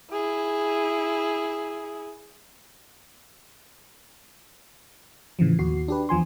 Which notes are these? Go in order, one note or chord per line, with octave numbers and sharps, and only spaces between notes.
E4 G#4
A2 C#3 E3 F3
D#2 F#4 C7
D4 G4 B4
E2 F3 G#5 C6